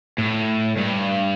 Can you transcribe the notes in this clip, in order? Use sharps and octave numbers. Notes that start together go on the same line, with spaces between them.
A2
G2